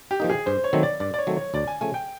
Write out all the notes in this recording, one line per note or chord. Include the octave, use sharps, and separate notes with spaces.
G4
F3 A#3 D#4
G#4
G2 C5
C#5
D#3 F#3 A3 C4
D5
G2 D5
D5
C#5
D#3 F#3 A3 C4
C#5
D2 D5
G#5
C#3 F3 A3 G#5
G5